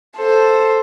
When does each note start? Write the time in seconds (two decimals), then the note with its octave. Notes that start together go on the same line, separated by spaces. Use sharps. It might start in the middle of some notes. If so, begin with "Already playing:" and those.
0.17 A4 C5